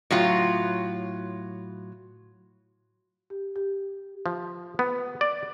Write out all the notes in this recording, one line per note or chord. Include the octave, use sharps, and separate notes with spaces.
A2 F#3 F4
G4
G4
F3
B3
D5